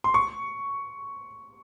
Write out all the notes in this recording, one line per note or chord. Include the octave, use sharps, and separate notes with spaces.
C6
C#6